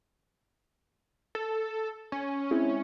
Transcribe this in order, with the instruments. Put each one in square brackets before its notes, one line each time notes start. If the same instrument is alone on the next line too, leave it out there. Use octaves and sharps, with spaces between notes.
[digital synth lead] A4
C#4
[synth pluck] G#3 C4 E4